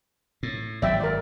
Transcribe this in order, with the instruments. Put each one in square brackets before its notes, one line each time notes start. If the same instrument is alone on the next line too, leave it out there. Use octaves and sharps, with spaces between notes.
[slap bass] A2
[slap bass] G#1 F#3 [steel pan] D5 E5 G5
[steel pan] A#4 D5